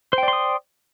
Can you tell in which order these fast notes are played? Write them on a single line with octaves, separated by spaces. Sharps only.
C5 G5 D5 C6 D#6